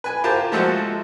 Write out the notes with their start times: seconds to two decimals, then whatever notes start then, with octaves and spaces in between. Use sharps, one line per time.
0.04 B4 G#5
0.24 F4 G4 A#4 C5 A5
0.52 F3 G#3 A3 F#4 A4 C5